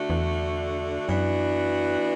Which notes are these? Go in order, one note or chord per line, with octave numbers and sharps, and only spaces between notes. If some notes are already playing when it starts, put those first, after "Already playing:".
Already playing: D3 A3 D4 F#4
E2
F#2 E3 B3 D4 F#4